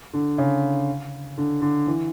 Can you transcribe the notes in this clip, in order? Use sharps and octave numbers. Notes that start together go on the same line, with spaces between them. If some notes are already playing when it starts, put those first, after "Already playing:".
D3
C#3
D3
D3
E3